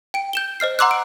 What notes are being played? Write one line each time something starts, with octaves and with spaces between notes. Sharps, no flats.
G5 D7
G6 E7 G7
C5 D#5 F6 C7
F#5 A#5 C6 D6 E6 F#6
D7